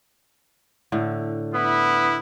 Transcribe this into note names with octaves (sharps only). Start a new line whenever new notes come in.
A2 D3
B3 E4